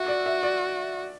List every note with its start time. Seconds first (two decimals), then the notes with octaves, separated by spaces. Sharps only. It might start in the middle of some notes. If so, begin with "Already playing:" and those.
Already playing: F#4 E5
0.08 D5
0.26 E5
0.43 D5